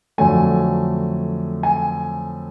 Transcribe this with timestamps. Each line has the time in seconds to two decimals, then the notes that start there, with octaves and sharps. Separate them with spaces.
0.18 F2 D3 F#3 A3 G#5
1.63 G#5